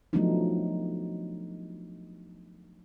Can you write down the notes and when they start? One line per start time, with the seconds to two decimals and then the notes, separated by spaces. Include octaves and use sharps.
0.13 F3 F#3 A3 B3 D4 D#4